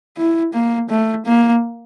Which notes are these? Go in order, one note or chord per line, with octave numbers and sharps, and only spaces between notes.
E4
A#3
A3
A#3